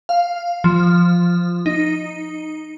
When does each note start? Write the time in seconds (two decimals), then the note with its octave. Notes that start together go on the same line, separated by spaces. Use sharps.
0.09 F5
0.64 F3
1.66 D#4